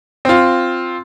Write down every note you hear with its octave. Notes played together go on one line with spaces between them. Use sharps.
C4 F4